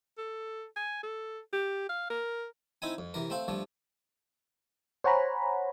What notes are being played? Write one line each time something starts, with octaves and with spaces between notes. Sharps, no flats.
A4
G#5
A4
G4
F5
A#4
C4 D#4 E4 G#5
F2
C3 E3 A#4
A3 C4 C5 F5
G2 F3 A3
C5 C#5 F#5 G#5 A#5 B5